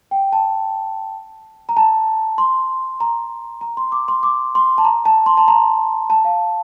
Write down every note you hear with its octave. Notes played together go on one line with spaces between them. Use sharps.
G5
A5
A#5
A5
C6
A#5
A#5
C6
D6
C6
D6
C6
A5
A#5
A5
C6
A5
A#5
A5
F5